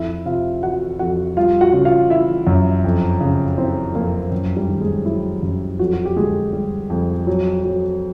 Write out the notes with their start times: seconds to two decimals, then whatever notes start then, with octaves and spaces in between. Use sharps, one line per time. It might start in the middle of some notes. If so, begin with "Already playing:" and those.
Already playing: F2 E4 E5
0.26 C3 F4 F5
0.63 E3 F#4 F#5
0.99 F2 F#4 F#5
1.37 G3 F4 F5
1.61 F#4 F#5
1.73 C#3
1.85 F4 F5
2.10 E3 E4 E5
2.47 F#2
2.84 F2
3.21 C#3
3.58 E3 C4 C5
3.95 F2 A#3 A#4
4.32 F#2
4.56 G3 G4
4.68 D#3
4.81 G#3 G#4
5.05 F#3 E4
5.43 F#2
5.79 F2 F#3 F#4
5.93 F#4
6.05 G4
6.16 D3 G#3 G#4
6.53 G3
6.90 F2
7.27 F#3
7.64 F#3